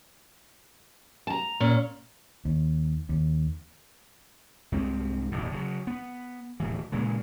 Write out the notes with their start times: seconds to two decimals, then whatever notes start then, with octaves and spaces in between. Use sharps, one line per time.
1.27 A5 A#5
1.60 A#2 C#4
2.45 D#2
3.09 D#2
4.72 C2 G#2 C4
5.31 D#1 A#1 F#2 A2
5.52 C#3 F3 F#3
5.87 B3
6.60 D1 A2 E3
6.92 A#2 C#3 E3 G#3